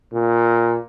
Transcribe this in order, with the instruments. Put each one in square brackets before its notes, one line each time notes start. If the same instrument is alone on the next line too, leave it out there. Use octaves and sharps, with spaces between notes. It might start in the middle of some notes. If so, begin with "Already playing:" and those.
[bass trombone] A#2